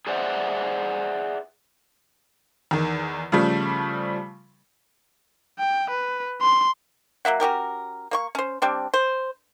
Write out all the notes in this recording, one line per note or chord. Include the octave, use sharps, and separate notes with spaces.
G#4 B4 C5 D5 E5 F#5
E2 D#3
C#3 F3 G3 A3
G5
B4
C6
F#3 A#3 E5 F#5
C#4 F#4 G4 A#4
A#3 C#5 C#6
C#4 C5
G3 C4 D4
C5